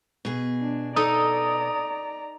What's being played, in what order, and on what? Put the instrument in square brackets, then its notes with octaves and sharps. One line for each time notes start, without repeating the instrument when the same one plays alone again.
[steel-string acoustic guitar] B2 G#4
[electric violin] D4
[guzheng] D#4 A4 [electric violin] D5 A#5 [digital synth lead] D#6